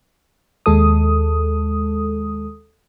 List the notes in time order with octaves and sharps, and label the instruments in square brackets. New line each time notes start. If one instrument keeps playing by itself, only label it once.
[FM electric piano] D#2 G#3 A4 D#6